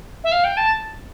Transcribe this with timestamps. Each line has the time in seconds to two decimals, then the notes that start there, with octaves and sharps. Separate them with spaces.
0.24 E5
0.32 F5
0.44 G5
0.57 A5